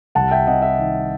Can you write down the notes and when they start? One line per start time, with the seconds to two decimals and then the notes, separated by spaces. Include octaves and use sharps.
0.15 C2 F#5 A5
0.31 E5 G5
0.47 C3 D#5 F#5
0.62 E5
0.78 D#3